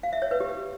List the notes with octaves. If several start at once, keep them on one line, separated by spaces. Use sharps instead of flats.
F5
E5
C#5
B4
G4